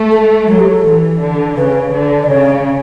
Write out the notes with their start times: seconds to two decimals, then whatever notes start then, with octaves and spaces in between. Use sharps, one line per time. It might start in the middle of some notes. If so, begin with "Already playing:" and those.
Already playing: A3
0.11 A4
0.47 F#3 A4
0.60 G4
0.71 A4
0.84 E3
1.21 D3
1.57 C#3 B4
1.93 D3
2.23 D5
2.29 C#3 C#5